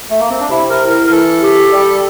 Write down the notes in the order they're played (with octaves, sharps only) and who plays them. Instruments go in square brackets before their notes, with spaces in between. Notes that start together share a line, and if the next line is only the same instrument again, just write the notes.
[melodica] A3
A#3
C4
D4
[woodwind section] C3 [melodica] E4
[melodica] A#4
[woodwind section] E4
[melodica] A#4
A#4
[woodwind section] E3 [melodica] A4
[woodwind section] G4
G3